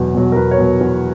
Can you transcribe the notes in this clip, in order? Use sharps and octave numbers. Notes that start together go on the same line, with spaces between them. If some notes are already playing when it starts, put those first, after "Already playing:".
Already playing: E2 B2 F#3
B2 F#3
A#4
E2 B4
C#5
B2 F#3
E2